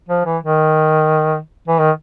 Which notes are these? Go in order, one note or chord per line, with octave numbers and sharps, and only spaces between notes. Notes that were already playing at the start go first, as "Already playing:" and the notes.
F3
E3
D#3
E3
D#3